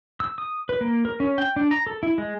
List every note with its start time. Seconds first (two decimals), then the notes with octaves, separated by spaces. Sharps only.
0.20 E6
0.38 D#6
0.69 B4
0.81 A#3
1.05 A#4
1.20 C#4
1.38 G5
1.56 D4
1.71 A#5
1.87 A4
2.03 E4
2.18 G#3